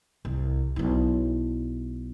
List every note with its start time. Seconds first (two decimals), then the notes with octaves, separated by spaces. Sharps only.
0.25 C2
0.76 B1 E4